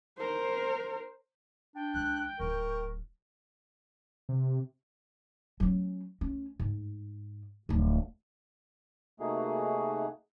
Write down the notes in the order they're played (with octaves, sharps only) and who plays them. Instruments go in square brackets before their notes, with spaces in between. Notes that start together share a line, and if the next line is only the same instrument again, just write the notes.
[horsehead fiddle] A#4 C5
[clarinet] D4 [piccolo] G5
[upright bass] C#2 E3 [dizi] F#6
[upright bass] D1 G#2 [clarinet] A#4 [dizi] C#6
[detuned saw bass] C3
[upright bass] F#3 C#4
C#4
G#2
D1 F3
[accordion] C3 A3 A#3 D#4 F#4 G#4